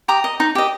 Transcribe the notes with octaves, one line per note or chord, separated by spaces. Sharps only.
G4 A#5 D#6
D#5
D#4
G4 D#5